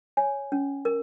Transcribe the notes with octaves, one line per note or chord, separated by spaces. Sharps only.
C#5 G#5
C#4
A#4